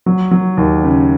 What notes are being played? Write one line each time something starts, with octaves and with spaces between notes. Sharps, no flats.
F#3
F#3
D#2
C#3